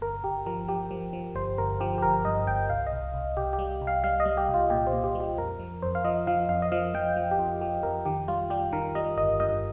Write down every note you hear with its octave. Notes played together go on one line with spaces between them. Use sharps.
G1 A#4
G1 G4
F3 A#4
F3 G4
F3
F3
G1 C5
G1 A#4
F3 G4
G4
G1 A#4
G2 D#5
G1 G5
C2 F5
D#5
C2
C2
C2 G4
G4
G3
C2
F5
G3 F5
D#5
G3
G4
C2
F4
A#2 G4
C5
A#2
G4
G3
G4
F2 A#4
F3
F2 C5
F5
F3 D#5
F3 F5
F2 F5
D#5
F3 F5
F3 G5
F3
G4
F2 F4
F3 G4
F2 A#4
D#3 G4
G3 F4
G3 G4
D#3 A#4
G3 D#5
G1 D#5
G2 D#5